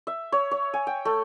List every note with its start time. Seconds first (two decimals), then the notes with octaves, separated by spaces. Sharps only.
0.07 E5
0.32 C#5
0.51 C#5
0.74 G#5
0.87 G5
1.05 A3